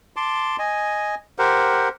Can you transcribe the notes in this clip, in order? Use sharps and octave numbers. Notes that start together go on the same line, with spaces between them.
A5 C6 D6
D#5 G#5
G4 A#4 C5 F#5